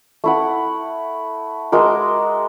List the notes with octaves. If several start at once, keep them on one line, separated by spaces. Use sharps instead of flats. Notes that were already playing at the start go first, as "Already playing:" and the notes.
A3 E4 F#5
G#3 F#4 A#4 D6